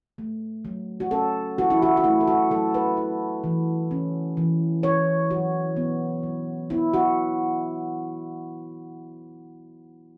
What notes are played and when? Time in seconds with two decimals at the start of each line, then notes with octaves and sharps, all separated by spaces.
0.18 A3
0.65 F#3
1.00 F#4
1.11 C#4 A4
1.58 E4 F#4
1.70 E4
1.82 F#4
1.97 F#4
2.04 A3 E4
2.21 A4
2.27 F#4
2.51 F#3 A4
2.74 B4
2.97 E4
3.44 E3
3.91 C#4
4.37 E3
4.83 E4 C#5
5.31 F#3 F#4
5.76 B3
6.23 F#3
6.70 B3 E4
6.93 F#4